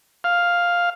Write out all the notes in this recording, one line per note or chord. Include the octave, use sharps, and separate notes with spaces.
F5